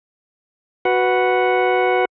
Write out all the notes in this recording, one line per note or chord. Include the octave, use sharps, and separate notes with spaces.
F#4 B4 F#5